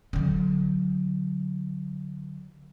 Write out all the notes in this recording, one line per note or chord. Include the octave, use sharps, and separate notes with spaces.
D3 F#3